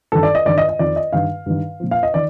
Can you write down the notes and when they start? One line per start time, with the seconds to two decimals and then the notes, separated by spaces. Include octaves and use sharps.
0.12 G2 D#3 A4
0.23 D5
0.35 D#5
0.45 G2 D#3 D5
0.58 D#5
0.69 D#5
0.79 F2 D#3 D5
0.96 D#5
1.13 G2 D#3 F5
1.46 G2 D#3
1.80 A#2 F3
1.91 F5
2.03 D#5
2.14 D#3 D5